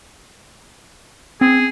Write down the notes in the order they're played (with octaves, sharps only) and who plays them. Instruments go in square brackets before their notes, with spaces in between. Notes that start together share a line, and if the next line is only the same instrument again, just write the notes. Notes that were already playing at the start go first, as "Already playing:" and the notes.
[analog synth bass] C4 [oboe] G#4